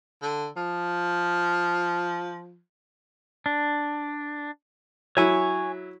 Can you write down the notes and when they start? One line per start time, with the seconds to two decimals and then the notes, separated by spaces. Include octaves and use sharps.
0.22 D3
0.56 F3
3.46 D4
5.17 F#3 E4 C#5 G#5 C#6